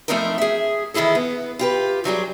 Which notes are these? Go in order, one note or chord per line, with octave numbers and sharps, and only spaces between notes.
F3 A3 C4 D#4 E4 A#4
G#4 E5
D#3 E3 E4 G#4 A4
B3
F4 G4 B4
F2 F#3 G3 G#4